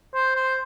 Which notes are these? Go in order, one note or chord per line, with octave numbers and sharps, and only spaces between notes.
C5
C5